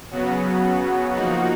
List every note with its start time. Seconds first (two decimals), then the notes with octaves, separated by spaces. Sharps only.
0.11 C#3 F#3 B3 F#4
1.14 F3 A#3 D#4 F#4